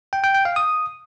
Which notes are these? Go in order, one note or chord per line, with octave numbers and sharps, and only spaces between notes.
G5
G5
G5
F5
D#6